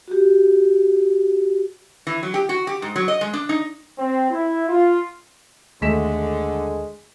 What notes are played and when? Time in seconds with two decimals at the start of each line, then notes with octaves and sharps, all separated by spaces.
0.08 F#4 G4
2.07 E3
2.23 F#3
2.34 G4
2.49 F#4
2.67 G4
2.82 G#2
2.96 F#3
3.08 D#5
3.21 G#3
3.33 D4
3.49 D#4
3.99 C4
4.31 E4
4.69 F4
5.82 D#2 D3 G#3 A3 B6 E7